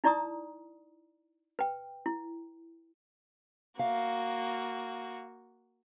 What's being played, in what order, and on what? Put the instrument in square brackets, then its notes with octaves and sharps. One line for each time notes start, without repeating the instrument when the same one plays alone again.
[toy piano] D#4 E4 D5 A#5 C#6 D#6
B4 G5
E4
[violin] A#3 F#4 [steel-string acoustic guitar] F5